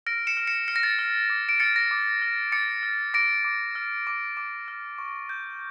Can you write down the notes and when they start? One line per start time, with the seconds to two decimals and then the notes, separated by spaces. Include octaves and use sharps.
0.06 F6 A#6 D7
0.27 C#7 E7
0.37 F6
0.47 C#7 E7
0.68 F6 C#7
0.76 A#6
0.83 A6 C#7
0.99 F6
1.30 D6
1.49 D7
1.60 F6 A6 C#7
1.76 A#6
1.91 D6
2.22 F6
2.52 D6 A6 C#7
2.83 F6
3.14 D6 A#6 D7
3.45 D6
3.75 F6
4.07 D6
4.37 D6
4.68 F6
4.98 C#6
5.29 G6